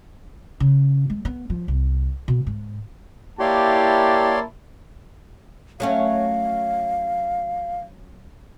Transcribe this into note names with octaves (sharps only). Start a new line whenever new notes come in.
C#3
G#3
B3
F3
C2
B2
G#2
A#3 E4 G4 C#5 D5 A5 C6
F#3 A3 C#4 F5